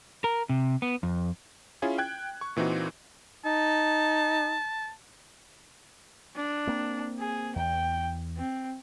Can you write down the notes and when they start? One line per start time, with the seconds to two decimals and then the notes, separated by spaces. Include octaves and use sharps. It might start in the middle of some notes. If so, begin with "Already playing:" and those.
0.24 A#4
0.49 C3
0.82 B3
1.03 F2
1.82 C#4 E4 F4 G#4 C#5
1.98 G5 F#6 G#6
2.41 C#6
2.56 A#2 E3 C4 D#4 F#4
3.45 D#4 A5
6.36 D4
6.67 A#3 C4
7.20 G#4
7.56 E2 G5
8.37 C4